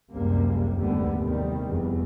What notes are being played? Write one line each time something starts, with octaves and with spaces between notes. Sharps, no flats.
F#1 C#2 C3 G3 A#3
D#2 G#2 D3 G3 A3 B3
C3 D#3 G3
F1 E2